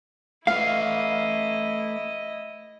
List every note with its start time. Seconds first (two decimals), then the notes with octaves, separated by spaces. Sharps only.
0.47 A3 E4 B4 D#5 F5 C7